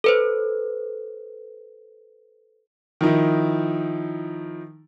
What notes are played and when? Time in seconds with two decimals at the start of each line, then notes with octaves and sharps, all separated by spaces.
0.04 A4 B4 C5
3.01 D#3 F3 D#4 E4